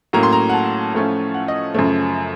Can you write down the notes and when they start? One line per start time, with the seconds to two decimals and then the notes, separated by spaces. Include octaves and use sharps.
0.13 A2 F#3 A#3 C#4 A#5
0.23 C6
0.32 A#5
0.49 F#5
0.53 A5
0.94 A2 F3 A3 C#4 F4
1.34 F#5
1.48 D#5
1.74 F#2 C#3 F3 A3